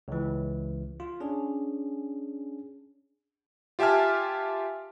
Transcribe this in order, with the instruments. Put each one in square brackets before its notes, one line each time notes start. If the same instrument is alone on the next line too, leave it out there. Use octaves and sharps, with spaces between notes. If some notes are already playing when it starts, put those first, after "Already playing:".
[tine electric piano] C#2 E3
F4
C#4 D4 G#4
[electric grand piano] F4 G4 E5 G#5 A5 F6